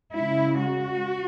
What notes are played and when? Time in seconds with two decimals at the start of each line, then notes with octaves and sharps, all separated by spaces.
0.13 C#3 G#3 E4
0.61 F#4